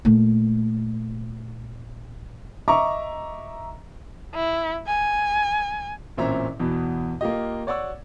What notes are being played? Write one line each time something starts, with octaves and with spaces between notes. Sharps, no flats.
A#2 A3
D#5 E5 A#5 C#6 D6
E4
G#5
A1 A#2 C4 C#4 E5 A#5
E2 B2
A#3 F4 G4 D#5
C#5 D5 F#5 C#6 E6